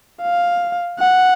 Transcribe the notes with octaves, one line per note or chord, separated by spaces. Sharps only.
F5
F#5